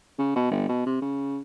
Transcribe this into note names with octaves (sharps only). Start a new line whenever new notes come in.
C#3
B2
G1
B2
C3
C#3